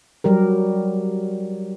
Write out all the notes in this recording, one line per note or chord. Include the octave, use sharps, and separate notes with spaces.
F#3 G3 G4 A#4